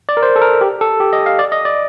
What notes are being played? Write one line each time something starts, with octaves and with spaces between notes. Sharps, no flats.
D5
A#4
C5
A4
A#4
G4
A4
G4
D#5
F5
D5
D#5
D5